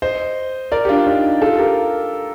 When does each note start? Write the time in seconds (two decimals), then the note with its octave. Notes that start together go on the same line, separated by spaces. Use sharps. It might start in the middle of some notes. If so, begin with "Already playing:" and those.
0.02 C5 D#5
0.72 A#4 D5
0.85 G4
0.89 D4 F4
1.07 D#4 G4
1.42 F4 A4
1.59 G4 A#4